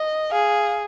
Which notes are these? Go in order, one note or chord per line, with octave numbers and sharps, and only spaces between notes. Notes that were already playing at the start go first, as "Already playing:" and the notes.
Already playing: D#5
G#4 F5